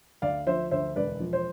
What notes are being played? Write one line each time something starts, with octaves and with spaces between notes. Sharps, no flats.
D2 D5 F5
F3 C5 E5
D2 C5 E5
E1 B4 D5
F3
C5